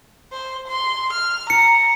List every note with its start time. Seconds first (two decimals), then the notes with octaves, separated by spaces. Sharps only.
0.32 C5
0.68 C6
1.13 F6
1.50 A#5 C#7